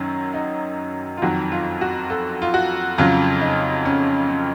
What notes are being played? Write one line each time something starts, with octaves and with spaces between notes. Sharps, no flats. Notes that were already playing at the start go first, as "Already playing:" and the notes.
Already playing: F#2 D#3 F#3 C#4
D#4
F4
F2 D#3 F#3 F#4
F4
F#4
A4
F4
F#4
F2 C#3 F#3 F4
D#4
C#4
C4